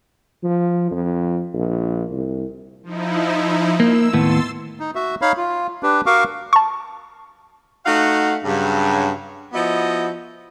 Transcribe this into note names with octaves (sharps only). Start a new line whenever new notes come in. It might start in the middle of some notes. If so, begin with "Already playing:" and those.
F3
F2
A#1
C2
F3 D#4 E4
A#3 E6
D#2 A2 B3 C6 E6 A6
D#4
F#4 E5
D#4 C#5 F5 B5
F4
D4 G4 B4
F#4 A#4 F5 C#6 D6
A5 C#6
A3 D#4 F#4 F5 F#5
G2 C#3 F#3
F3 B3 E4 F#4 D#5